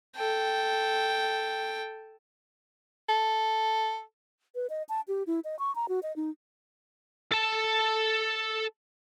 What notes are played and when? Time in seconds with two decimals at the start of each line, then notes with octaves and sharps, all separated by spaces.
0.16 A4 G5
3.09 A4
4.55 B4
4.70 D#5
4.89 A5
5.08 G4
5.27 E4
5.44 D#5
5.59 C#6
5.75 A#5
5.89 F#4
6.03 D#5
6.16 D#4
7.32 A4 A5